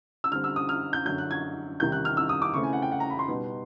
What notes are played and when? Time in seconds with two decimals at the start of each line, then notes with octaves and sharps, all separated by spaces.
0.24 E6
0.32 D3 G3 C4 F6
0.44 E6
0.56 D#6
0.69 F6
0.93 G6
1.05 F#2 D3 F#3 G6
1.18 F#6
1.31 G#6
1.80 E2 C3 D#3 G3 G6
1.92 F#6
2.05 F6
2.17 E6
2.29 D#6
2.42 D6
2.54 C#3 E3 A3 C4 C#6
2.63 G#5
2.73 F#5
2.82 G5
2.92 F#5
3.00 A#5
3.10 B5
3.19 C6
3.28 B2 G3 B3 D#4